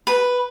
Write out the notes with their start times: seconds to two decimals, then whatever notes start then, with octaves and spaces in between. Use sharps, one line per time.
0.07 B4